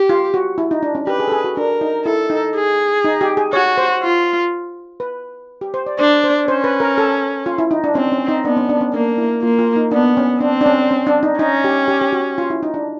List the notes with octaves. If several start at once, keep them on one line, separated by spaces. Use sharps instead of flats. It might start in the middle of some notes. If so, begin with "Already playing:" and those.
Already playing: G4
F4
F#4
E4
D#4
D4
C#4
G4 B4
G#4
A4
G#4
F#4
D4 A#4
D#4
E4 A4
D#4
G#4
D#4
G4
G#4
F#4 C#5
C5
F4
B4
G4
C5
D5
D4 C5
C5
C#4 C5
B4
A#4
A4
F4
E4
D#4
D4
C4 C#4
C#4
D#4
B3 D4
C#4
D4
C#4
A#3 D4
E4
A#3 F4
F4
D#4
B3 D4
C#4
C4 D4
D4
C#4
C#4
D4
D#4
C#4 D#4
G4
G4
G4
F#4
F4
E4
D#4
D4